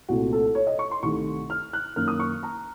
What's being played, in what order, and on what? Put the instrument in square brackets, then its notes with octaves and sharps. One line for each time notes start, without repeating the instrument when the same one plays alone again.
[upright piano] C2 A#2 A3 F#4
A4
C#5
D#5
C#6
C6
C2 C3 D#3 A3 C#6
F6
F#6
F#2 D#3 A#3 F6
D#6
C#6
A#5